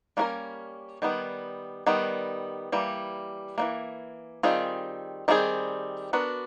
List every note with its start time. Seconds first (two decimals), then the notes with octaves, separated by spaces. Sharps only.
0.17 G3 A#3 C#4 F#4 A#4
1.02 D#3 G3 B3
1.87 D#3 G3 B3
2.72 E3 G3 A#3
3.58 E3 G3 A#3
4.43 D#3 G3 C4 F4 G#4
5.28 D#3 G3 C4 F4 G#4
6.13 B3 D4 F#4 A#4